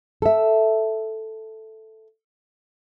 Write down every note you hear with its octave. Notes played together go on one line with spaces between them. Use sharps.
A4 E5